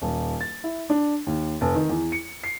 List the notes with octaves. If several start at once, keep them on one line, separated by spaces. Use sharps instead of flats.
D#1
A6
E4
D4
D#2
F1
D#3
E2
C#7
C7